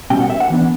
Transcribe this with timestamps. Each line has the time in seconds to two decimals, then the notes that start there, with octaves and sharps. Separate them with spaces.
0.10 B2 G3 C#4 G5
0.20 F#5
0.30 E5
0.40 F#5
0.50 E3 B3 D4